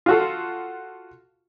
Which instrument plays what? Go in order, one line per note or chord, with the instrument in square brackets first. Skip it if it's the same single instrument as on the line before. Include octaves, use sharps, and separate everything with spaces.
[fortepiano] F4 F#4 A4